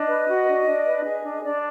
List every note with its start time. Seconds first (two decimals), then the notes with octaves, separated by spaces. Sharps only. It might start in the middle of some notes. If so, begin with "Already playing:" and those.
Already playing: D4 D#5
0.08 B4
0.28 F#4
0.47 D4
0.66 D4
0.86 B4
1.05 G#4
1.24 D4
1.43 D4 D5